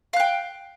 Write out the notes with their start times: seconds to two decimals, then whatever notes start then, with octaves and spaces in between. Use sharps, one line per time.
0.13 F5
0.16 F#6
0.20 G5